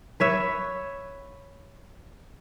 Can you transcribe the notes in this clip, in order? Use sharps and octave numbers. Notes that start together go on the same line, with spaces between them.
B4 C#5 E5